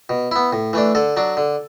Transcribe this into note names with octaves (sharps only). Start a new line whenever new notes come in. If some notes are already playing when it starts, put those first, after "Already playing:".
B2
B3 E4
A2
E3 A3 D4
D3 A4
F#3 D4
D3